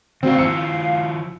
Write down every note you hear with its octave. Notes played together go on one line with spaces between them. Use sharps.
D#3 A#3 C4 F#4 D5 F5
D#3 F3 F5 E6 C#7